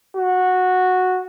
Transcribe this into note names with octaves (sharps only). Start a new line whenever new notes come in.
F#4